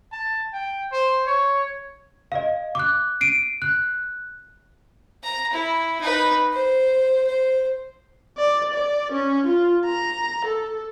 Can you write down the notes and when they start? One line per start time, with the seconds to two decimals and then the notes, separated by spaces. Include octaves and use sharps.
0.12 A5
0.53 G5
0.92 C5
1.26 C#5
2.32 D#5 F5
2.75 D6 F#6
3.21 C7 D7 D#7
3.62 F#6
5.23 A#5
5.53 E4
6.01 D#4 B4
6.52 C5
7.26 C5
8.38 D5
8.74 D5
9.12 C#4
9.47 F4
9.85 A#5
10.45 A4